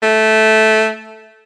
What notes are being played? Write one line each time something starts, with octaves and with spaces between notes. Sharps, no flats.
A3